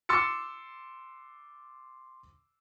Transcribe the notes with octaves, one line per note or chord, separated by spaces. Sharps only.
C6 D6 E6 A6 C#7